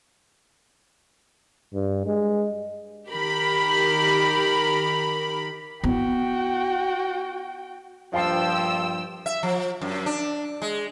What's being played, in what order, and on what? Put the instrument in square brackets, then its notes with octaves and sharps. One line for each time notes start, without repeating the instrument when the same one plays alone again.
[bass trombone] G2
G#3
[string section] D#3 G4 A#4 B5
[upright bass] B3 E4 [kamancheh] F#4 G5
[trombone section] A#1 G2 F3 [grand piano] F5 A5 C7 [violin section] G5 E6
[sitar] E5
F3
F#2
D4
G#3